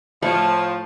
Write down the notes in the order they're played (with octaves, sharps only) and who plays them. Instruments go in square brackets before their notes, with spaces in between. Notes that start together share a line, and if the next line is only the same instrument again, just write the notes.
[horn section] A2 F3 [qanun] A3